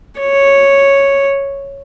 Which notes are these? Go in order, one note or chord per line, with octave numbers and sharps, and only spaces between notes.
C#5